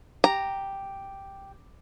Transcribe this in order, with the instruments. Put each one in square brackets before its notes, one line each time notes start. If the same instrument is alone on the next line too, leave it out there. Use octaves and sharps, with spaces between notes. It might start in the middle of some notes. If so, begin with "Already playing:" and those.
[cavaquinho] G4 [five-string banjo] A#5